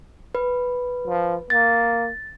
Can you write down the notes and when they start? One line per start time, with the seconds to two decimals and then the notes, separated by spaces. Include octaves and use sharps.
0.35 B4
1.07 F3
1.50 A#3 A6